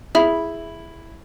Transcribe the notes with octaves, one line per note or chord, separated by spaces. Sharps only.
E4 G#4 E5 B5